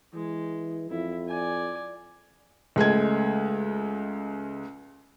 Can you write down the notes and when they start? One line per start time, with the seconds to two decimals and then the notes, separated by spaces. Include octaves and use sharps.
0.13 E3 G#3
0.90 F2 E4
1.28 D5 G#5
2.76 C#2 G#3 A3 G#6